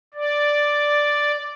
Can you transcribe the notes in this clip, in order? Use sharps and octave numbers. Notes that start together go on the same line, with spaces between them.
D5